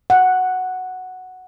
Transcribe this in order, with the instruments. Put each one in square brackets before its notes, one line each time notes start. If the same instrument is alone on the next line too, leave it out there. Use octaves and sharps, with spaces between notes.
[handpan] F#5